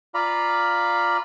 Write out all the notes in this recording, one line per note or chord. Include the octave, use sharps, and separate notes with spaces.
F4 D5 F5 A#5 B5